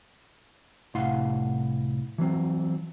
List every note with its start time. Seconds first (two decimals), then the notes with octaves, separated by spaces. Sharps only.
0.95 C2 A2 E4 F5 F#5 C6
2.18 E3 F#3 C4